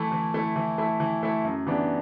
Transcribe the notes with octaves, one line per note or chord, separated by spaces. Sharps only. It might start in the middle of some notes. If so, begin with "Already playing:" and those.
Already playing: E3 A3 E4
E3
A3 E4
E3
A3 E4
E3
A3 E4
F#2
E3 B3 D4 G4